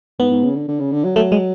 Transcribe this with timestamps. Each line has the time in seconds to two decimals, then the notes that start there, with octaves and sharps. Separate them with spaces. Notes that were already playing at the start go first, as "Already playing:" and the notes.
0.20 G#2 B3
0.31 G#2
0.44 C#3
0.55 D3
0.68 D3
0.80 C#3
0.92 D3
1.04 F#3
1.16 F#3 A3
1.32 G#3